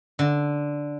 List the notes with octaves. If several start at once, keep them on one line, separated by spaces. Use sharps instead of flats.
D3